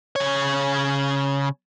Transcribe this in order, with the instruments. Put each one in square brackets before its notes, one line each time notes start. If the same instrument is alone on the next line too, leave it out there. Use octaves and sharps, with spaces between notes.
[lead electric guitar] C#3 C#5